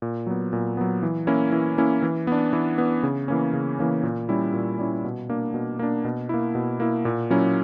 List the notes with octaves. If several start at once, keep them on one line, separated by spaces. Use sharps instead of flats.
A#2
F#3 B3
A#2
F#3 B3
E3
A#3 C#4 E4
E3
A#3 C#4 E4
E3
B3 D4
E3
B3 D4
C#3
E3 A#3 C#4
C#3
E3 A#3 C#4
A#2
G3 C#4 E4
A#2
G3 C#4 E4
B2
A#3 D4
B2
A#3 D4
B2
A#3 E4
B2
A#3 E4
A#2
F#3 A#3 C#4 E4